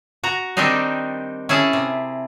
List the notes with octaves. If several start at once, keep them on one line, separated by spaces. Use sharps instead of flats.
F#4 A#5
D#3 G3 C4 D4 D#4
C#4 E4 G#4 A5
C3